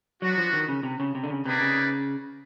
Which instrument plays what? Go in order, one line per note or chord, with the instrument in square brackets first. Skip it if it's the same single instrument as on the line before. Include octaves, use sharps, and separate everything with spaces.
[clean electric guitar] F#3 [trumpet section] B3 D4 F#4
[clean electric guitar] F3
D#3
C#3
C3
C#3
C3
D3
C#3
[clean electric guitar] C3 [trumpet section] A#3 D#4 G#4 B4 D5
[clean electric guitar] C#3